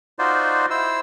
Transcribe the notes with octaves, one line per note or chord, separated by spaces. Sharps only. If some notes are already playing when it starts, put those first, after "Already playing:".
D#4 F4 F#4 C5 D5
E4 C5 E6